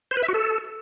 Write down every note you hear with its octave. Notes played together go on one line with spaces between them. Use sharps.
C5
B4
E5
F#4
A4